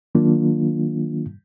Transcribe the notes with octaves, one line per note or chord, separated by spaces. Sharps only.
D#3 F#3 A#3 D4 F4